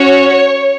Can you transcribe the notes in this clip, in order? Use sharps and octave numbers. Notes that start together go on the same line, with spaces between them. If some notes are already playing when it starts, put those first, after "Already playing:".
Already playing: C#4 F#4 C#5